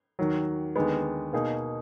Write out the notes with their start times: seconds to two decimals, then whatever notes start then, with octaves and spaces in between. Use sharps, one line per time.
0.19 D#2 D#3 F#3
0.76 D#2 D3 G#3 B3
1.33 B2 A#3 D#4 G#4